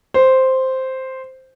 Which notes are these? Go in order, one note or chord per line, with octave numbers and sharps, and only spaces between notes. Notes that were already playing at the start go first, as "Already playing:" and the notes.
C5